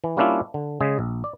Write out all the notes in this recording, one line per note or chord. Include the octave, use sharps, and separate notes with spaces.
E3
G3 A#3 C#4 D4 E4 F4
D3
C#3 G#3 G#4
A#1
D5